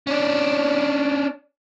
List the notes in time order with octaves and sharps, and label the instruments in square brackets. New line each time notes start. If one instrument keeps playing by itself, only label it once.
[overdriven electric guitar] C#4 D4